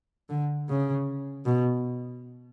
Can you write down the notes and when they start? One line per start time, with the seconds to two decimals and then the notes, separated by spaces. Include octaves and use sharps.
0.29 D3
0.69 C#3
1.45 B2